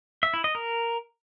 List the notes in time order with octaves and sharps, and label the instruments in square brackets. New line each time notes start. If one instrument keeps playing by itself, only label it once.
[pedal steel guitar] E5
E4
D#5
A#4